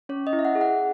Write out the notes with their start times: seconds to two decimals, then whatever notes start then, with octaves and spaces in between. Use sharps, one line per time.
0.09 C#4 C#5
0.27 D#5
0.33 E4
0.39 E5
0.45 F#5
0.55 G#4
0.61 F#5